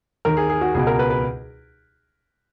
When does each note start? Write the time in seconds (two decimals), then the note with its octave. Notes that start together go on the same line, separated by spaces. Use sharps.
0.25 D#2 D#3 A#4
0.37 G#4
0.50 G#4
0.61 F#4
0.74 C#2 B2 G#4
0.87 A#4
0.99 B4
1.10 B4